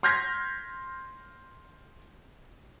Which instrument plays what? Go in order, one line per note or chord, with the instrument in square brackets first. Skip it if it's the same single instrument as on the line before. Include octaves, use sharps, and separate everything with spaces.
[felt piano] C6 F6 G6 G#6 A#6 B6